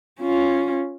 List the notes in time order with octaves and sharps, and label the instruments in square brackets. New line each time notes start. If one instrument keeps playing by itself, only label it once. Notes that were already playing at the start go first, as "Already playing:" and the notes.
[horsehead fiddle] C#4 F4